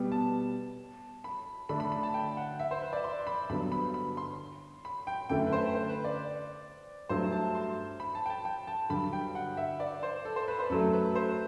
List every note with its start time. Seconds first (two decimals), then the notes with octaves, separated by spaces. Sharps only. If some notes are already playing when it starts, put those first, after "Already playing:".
Already playing: B2 G3 B3
0.12 A5
1.24 B5
1.69 D3 A3 D4 B5
1.80 B5
1.92 B5
2.03 A5
2.14 G5
2.37 F#5
2.60 E5
2.71 C5
2.82 B4
2.93 D5
3.04 C6
3.27 B5
3.49 G2 D3 F#3 B3 B5
3.72 B5
3.94 B5
4.17 C6
4.85 B5
5.07 G5
5.29 F#2 D3 A3 E4 G5
5.46 B4
5.53 C5
5.75 C5
5.89 B4
6.05 D5
7.09 G2 F#3 A3 E4 C5
7.32 A5
7.55 C6
8.00 B5
8.15 A5
8.26 G5
8.30 A5
8.45 G5
8.67 A5
8.89 G2 D3 F#3 B5
9.13 G5
9.35 F#5
9.57 E5
9.80 D5
10.03 C5
10.25 A4
10.36 C5
10.48 B4
10.59 C5
10.70 F#2 F#3 A3 A4
10.93 B4
11.15 C5